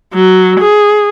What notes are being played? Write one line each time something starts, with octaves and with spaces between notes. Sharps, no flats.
F#3
G#4